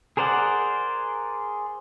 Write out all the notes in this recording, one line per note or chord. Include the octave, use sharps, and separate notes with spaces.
G#4 A#4 C5 D5 F#5